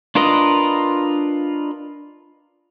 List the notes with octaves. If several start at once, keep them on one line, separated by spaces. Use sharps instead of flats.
D4 F4 A#4 B4 D#5